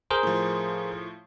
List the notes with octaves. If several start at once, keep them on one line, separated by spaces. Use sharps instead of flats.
G#4 A#4 C5
A2 F3